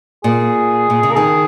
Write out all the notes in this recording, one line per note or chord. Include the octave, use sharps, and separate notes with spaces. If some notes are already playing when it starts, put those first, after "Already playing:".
A#2 G#4
A#2
C#3
A#4
D#3 G#4